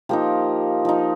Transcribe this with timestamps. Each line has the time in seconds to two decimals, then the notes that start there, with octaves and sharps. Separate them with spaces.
0.09 F3 A#3 D#4 G4 C5
0.85 F3 D#4